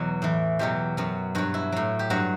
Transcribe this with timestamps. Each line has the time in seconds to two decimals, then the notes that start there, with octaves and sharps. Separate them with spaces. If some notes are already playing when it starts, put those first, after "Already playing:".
Already playing: E2 B2 F#3 F#4
0.22 A2 E3
0.59 E2 B2 F#3 G4
0.97 F#2 F#3
1.35 G2 F#3 F#4
1.54 E4
1.72 A2 F#3
1.99 G4
2.10 G2 F#3 F#4